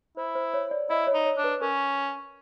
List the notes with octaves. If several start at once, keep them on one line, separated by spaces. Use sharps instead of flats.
E4 C5
C5
C#5
D5
E4 D#5
C#5
D#4
C#5
D4
B4
C#4 A#4